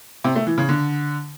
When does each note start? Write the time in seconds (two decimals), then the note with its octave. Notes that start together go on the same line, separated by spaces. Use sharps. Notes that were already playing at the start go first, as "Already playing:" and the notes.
0.24 C3
0.35 A3
0.47 E3
0.58 C#3
0.69 D3